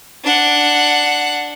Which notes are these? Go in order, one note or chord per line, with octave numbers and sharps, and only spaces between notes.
D4 F#5